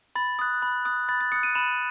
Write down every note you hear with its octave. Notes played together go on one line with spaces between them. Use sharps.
B5 A6
D#6 F#6
B5
D#6 F#6
B5 A6
A6
D#6 F#6 C#7
D#7
B5 E7